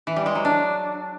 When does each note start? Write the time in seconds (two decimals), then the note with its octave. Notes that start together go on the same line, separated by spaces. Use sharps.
0.07 E3
0.16 G3
0.26 G#3
0.35 F#3
0.45 D4